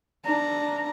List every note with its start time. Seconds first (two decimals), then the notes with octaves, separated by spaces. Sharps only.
0.25 D4 A#5